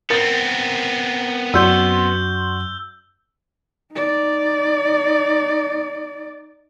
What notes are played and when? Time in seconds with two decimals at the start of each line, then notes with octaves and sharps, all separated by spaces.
0.10 B3 C4 A#4 A6
1.54 F#2 F#4 D5 C6 E6 G6 G7
3.93 D#4 D5